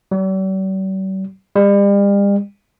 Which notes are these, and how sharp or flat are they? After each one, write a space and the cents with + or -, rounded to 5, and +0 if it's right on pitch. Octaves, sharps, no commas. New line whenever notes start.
G3 -45
G3 +40